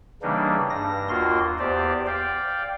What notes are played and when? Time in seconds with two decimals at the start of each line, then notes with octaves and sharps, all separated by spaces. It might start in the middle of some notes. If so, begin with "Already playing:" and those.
0.22 C#3 E3 G3 A#3 D4 D#4
0.70 G2 A#6
1.09 D#2 A#3 F4 F#4 A#4 C6
1.59 E2 G4 C5 D5
2.06 D5 F5 G5